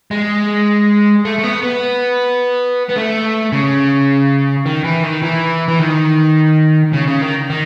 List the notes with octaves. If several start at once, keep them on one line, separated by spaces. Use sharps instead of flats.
G#3
A3
A3
B3
B3
B3
A3
C#3
D#3
E3
D#3
E3
E3
D#3
C#3
C#3
D#3
D#3